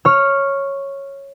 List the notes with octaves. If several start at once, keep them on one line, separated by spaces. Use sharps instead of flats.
C#5 F6